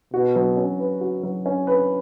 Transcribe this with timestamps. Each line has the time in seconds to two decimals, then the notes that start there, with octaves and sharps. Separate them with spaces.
0.14 B2 F#4
0.36 F#3
0.57 C#4
0.79 B4
1.01 F#4
1.23 F#3
1.46 C#4
1.67 B4